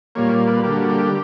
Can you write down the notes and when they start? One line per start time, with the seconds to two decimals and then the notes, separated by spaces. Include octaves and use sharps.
0.15 A#2 G3 A#3 C#5
0.48 B4
0.63 D3 G3 A#3 G4
0.77 F#4
0.90 G4